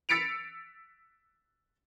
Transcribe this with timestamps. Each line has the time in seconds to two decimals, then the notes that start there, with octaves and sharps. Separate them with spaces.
0.09 E6 A6 B6 C#7 D7 F7